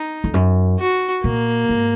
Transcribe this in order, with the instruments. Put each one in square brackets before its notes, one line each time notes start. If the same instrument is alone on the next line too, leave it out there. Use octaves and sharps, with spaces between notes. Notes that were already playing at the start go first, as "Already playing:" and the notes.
Already playing: [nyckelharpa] D#4
[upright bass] F2
F#2
[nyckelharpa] F#4
[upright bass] A#2 [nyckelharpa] A#3
[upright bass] G#2